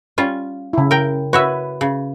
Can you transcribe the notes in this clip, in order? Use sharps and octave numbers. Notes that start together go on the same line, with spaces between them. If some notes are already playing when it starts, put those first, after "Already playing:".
G3 C#4 F4
C#3 E4
A#4 G5
F#4 B4 C#5 E5
C#3